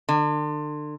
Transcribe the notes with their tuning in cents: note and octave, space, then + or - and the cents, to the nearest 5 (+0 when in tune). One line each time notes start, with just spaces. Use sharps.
D3 +35